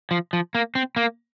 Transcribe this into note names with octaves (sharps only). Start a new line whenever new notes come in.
F3
F3
A#3
C4
A#3